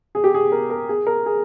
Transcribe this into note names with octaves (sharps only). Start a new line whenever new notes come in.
G#4
G4
G#4
A#4
A#4
G#4
A#4
G#4